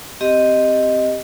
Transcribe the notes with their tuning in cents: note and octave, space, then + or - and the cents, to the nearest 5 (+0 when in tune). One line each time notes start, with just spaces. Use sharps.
C4 +0 G4 +0 D#5 +0